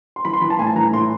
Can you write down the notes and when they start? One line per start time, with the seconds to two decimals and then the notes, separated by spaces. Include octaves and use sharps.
0.16 C6
0.25 E3 B5
0.33 C6
0.42 E3 B5
0.50 A5
0.59 A2 G#5
0.67 A5
0.76 E3 A#5
0.93 A2 C6